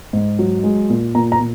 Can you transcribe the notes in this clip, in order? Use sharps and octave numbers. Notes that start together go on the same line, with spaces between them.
G#2
F#3
G#3
A#2
A#2 A#5
A#5
A#2